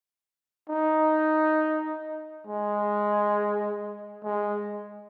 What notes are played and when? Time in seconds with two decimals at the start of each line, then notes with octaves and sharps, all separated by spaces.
0.70 D#4
2.47 G#3
4.24 G#3